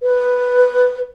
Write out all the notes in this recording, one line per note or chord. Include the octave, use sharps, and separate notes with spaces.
B4